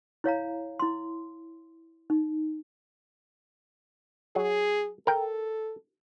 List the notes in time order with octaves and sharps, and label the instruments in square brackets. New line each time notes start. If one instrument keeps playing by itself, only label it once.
[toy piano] E4 C#5 F5 A#5
E4 C6
D#4
[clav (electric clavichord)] F#3 [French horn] G#4
[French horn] A4 [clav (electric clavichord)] A#4 G5